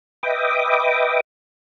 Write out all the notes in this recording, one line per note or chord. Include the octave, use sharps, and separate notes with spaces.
B4 D#5 E5 G5 D6 D#6